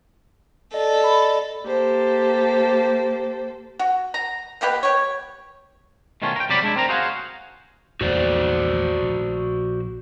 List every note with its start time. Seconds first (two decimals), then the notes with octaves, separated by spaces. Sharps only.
0.74 A4 D5 D#5
1.04 B5
1.63 A#3 G4 A4 C5
3.79 F#4
4.14 A#5
4.61 B2 A#3 G4 B4
4.83 G4 C#5
6.22 B2 D#3 A3 C#4 F4
6.36 A#4 G5
6.49 C3 F#3 G3 D5 B5
6.62 G#3 D4 E4
6.76 C4 A#4 A#5
6.89 F#4 G#4 C5 C#5 F5 F#5
8.01 A#1 E2 A#3 F#4 C5 D5
9.02 A#1